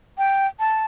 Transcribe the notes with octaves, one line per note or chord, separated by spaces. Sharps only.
G5
A5